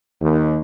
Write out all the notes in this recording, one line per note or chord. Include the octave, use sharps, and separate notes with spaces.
D#2